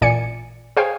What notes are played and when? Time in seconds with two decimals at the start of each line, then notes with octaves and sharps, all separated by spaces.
0.01 A1 A#2 D5 G#5 C#7
0.77 G#4 C5 C#5 F5 G5 G#5